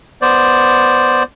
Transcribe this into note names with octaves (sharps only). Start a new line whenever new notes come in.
B3 C5 D5